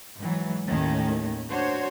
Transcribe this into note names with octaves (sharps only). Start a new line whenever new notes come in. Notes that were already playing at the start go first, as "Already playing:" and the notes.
G#2 E3 F#3
D#2 A2 D#3 A3 C#4
D4 F#4 C5 C#5